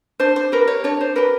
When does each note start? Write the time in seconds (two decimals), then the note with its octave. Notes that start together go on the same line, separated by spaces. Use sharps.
0.20 D4 C5
0.36 C5
0.52 G4 A#4 B4
0.68 C#5
0.84 D4 C#5
1.01 C5
1.16 G4 A#4 B4